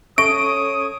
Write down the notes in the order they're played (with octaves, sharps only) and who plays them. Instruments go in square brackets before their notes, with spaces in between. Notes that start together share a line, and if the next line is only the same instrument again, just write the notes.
[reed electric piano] C#4 A4 [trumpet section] C#5 D#6 [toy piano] E5 C#6 [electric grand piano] D7